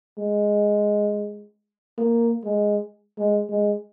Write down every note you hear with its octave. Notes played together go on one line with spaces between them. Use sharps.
G#3
A#3
G#3
G#3
G#3